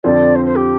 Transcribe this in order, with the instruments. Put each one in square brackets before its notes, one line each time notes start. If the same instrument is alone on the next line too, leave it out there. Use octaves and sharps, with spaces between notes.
[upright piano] F2 D3 F3 C4 [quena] D5
[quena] C5
C5
G4